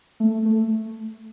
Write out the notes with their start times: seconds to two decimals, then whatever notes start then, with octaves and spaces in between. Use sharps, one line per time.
0.20 A3
0.45 A3